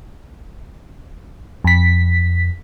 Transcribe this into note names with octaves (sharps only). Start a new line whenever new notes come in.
F2 B6